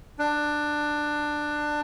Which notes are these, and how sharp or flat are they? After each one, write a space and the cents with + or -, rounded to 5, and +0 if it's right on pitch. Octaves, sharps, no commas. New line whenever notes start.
D4 +15